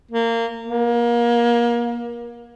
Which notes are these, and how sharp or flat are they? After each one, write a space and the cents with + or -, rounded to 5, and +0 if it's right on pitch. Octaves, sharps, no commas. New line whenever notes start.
A#3 -20
A#3 +30